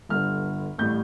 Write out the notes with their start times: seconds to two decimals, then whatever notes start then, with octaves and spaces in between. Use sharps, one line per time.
0.09 G1 G2 D3 F6
0.78 A1 A2 G3 G6